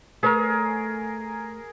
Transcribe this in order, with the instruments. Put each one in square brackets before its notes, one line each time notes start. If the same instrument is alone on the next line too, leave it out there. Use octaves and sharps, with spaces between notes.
[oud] A3 B4 C#5 [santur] G#4 A#4